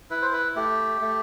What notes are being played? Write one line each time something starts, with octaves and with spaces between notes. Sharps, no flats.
E4 B4
C5
B4
A3 G4
A3